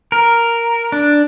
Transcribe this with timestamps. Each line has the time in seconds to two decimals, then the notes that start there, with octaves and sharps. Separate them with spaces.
0.12 A#4
0.92 D4